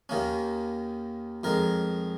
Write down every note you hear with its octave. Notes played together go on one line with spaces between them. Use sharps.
D#2 D#3 A#3 C#4
F2 D#3 G#3 A#4